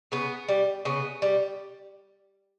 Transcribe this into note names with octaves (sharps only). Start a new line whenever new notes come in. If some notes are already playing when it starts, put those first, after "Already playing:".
C#3 B3
G3
C#3 B3
G3